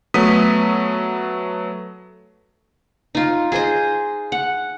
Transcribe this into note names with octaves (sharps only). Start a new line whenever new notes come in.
F#3 A3 B3 D#6 B6
D#4 F4
G#4 C5 D#5
F#5